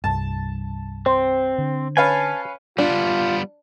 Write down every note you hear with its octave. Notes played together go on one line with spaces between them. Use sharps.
C2 G2 A5
C4 C5
D3
C#4 B4 F5 G#5 A5
G3 B3 D4 F4